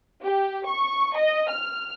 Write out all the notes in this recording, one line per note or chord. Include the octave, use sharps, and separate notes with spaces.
G4
C#6
D#5
F6